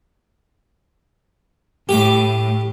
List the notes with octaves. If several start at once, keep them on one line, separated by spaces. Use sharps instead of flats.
A2 G4 D6